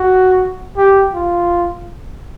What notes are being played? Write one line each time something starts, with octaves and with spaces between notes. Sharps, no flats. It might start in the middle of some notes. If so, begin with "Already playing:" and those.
Already playing: F#4
G4
F4